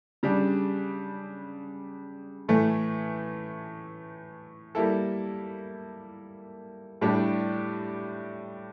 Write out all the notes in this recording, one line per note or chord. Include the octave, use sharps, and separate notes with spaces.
C#3 G3 D4
A2 E3 A3
G3 A#3 E4 A4
A2 G3 D4 G4